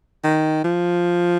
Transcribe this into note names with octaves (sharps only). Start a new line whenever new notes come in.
D#3
F3